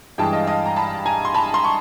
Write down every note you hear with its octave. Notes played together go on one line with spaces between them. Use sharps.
G2 E3 G#3 G5 A5
D#5 F5
D#5 F5
A#5
A5 B5
G#5 A#5
C6
A5 B5
A#5 C6
C#6